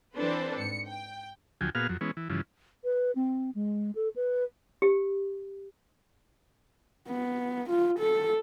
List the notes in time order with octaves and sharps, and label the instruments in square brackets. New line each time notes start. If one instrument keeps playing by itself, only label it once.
[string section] E3 C4 D4 A4 B4 C5
G#2 C#7
G5
[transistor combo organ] D2 F3 F#3 G5 G#5
A#2 B3 F#4 G#4 F5 F6
F2 F#3
E3 G#3 B3 C#4
E3
G2 C#3 E3 F3
[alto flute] B4
C4
G#3
A4
B4
[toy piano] G4
[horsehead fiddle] B3
F4
A4